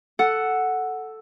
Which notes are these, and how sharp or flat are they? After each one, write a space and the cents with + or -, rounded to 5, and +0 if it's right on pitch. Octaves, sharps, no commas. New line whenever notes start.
A4 +0 F#5 +0